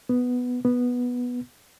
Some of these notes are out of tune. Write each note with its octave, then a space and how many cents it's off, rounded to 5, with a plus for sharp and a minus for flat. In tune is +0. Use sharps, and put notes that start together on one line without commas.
B3 +5
B3 -5